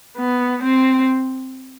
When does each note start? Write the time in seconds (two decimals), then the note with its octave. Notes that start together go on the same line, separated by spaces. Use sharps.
0.18 B3
0.62 C4